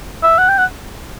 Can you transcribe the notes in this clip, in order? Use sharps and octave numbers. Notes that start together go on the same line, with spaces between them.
E5
F#5
G5
F#5